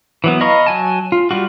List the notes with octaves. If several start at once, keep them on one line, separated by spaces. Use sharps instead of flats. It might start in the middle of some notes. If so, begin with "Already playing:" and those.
E3 F#3 B3
D#5 F5 A#5 B5 C#6
F#3 G#5 A5
F4
G3 F4 F#4